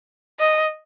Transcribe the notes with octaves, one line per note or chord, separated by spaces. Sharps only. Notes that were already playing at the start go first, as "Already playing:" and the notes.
D#5